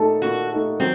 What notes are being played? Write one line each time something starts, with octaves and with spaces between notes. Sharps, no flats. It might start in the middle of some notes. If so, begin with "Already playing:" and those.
Already playing: A#2 A3 D#4 A4
A#2 F#4
A3 D#4 A4
F#3 C4